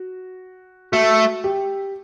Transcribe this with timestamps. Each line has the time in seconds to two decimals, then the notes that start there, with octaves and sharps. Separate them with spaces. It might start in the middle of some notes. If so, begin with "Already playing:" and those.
Already playing: F#4
0.92 A3 F#4
1.44 G4